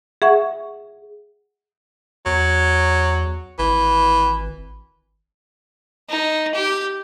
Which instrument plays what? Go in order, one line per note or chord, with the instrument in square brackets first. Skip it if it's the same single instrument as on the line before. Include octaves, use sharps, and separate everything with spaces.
[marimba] G#4 E5 F#5 C#6
[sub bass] E2 [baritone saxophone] F#3
[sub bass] G#1 [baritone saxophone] E3
[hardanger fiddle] D#4
G4